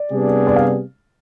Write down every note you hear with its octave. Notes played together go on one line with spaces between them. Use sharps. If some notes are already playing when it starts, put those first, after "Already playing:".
Already playing: D5
C3 G3 B3 D4 G#4
D5
F5